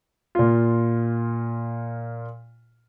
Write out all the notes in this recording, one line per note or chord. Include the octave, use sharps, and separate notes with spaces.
A#2 F4